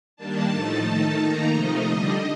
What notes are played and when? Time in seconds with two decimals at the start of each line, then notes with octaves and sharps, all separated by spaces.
0.16 D#3 G3 A#3 D4 A5
0.50 A2 F3 A3 D#4
0.85 D#3 A3 D#4
1.18 D#3 A#3 D#4 A#5
1.52 C3 F3 A3 D#4 D#5
1.86 D3 G3 D4